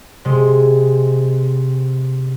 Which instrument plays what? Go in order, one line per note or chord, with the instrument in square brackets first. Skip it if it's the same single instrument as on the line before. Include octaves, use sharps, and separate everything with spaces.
[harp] C3 G#3